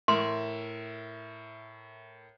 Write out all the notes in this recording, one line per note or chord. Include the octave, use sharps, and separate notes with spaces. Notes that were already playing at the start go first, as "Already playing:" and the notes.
A2 A#4 E5 C6